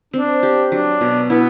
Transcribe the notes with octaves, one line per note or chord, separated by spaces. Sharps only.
C4 D4
G4
F#3 D4
B2
B3 E4